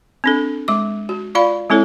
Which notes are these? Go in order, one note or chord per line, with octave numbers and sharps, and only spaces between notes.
C4 D4 A4
G#3 D6
F#4
F4 D5 F5 B5
G#3 C4 E4 A4 C#5